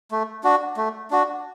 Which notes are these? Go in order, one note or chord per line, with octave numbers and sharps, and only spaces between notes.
A3
D4 F#4
A3
D4 F#4